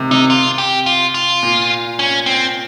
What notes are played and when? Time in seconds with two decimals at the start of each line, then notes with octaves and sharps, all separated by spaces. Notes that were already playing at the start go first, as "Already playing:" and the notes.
Already playing: C3 D#3
0.11 C3 D#4
0.30 F4
0.58 G4
0.86 F4
1.14 F4
1.43 A#2
1.99 C#4
2.26 C4